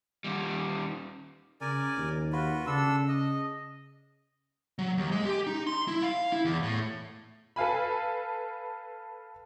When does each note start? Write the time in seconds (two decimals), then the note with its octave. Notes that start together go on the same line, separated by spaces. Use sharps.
0.24 D#2 G3
1.61 C#3 A#4 D5 G#5
1.97 D#2
2.32 F4 F#4 B4
2.67 C#3 D4 A4 E6
3.08 D#5
4.79 F#3
4.97 D#2
5.12 G#3
5.26 G4
5.47 D#4
5.67 C6
5.88 E4
6.02 F5
6.33 E4
6.45 E2
6.62 A2
7.56 A4 B4 F5 G#5 B5